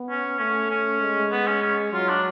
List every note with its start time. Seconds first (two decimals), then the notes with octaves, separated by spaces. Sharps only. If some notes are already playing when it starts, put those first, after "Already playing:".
Already playing: B3
0.10 C#4
0.39 A3 C#4
0.70 C#4
1.01 G#3
1.31 B3
1.47 C#4
1.62 C#4
1.93 F#3 F4
2.08 D4